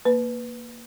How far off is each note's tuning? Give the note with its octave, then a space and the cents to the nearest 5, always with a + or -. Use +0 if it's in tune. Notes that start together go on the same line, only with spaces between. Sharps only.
A#3 +0 B4 +0